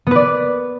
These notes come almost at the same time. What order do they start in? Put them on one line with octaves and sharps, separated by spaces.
B3 B4 D5